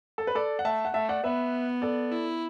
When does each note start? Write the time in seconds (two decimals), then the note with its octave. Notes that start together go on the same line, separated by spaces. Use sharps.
0.18 A4
0.27 B4
0.35 A4 D5
0.59 F#5
0.65 A3 E5 A5
0.85 F#5
0.94 A3 E5 A5
1.09 D5 F#5
1.24 B3 B4 E5
1.82 A4 D5
2.12 E4